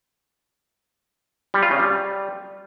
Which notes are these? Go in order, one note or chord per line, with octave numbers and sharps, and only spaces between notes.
G3
F4
C#3
G3